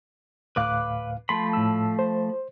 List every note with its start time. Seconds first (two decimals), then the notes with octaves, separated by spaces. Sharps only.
0.56 D2 A2 B4 F5 D6 F#6
1.29 F3 A3 B5 C6
1.53 A2 E6
1.99 C5